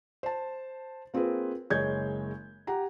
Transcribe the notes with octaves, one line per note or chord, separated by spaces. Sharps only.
C5 A5
A#3 C4 F4 G#4 B4
F#1 G#3 C#5 D#5 G6 G#6
G4 F#5 A#5